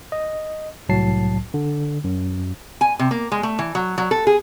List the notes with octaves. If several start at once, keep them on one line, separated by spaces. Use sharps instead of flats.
D#5
C2 A2 F#3 A5 C7
D3
F#2
G#5
C3
A#3
G#3
A3
E3
F#3
F#3
A4
G#4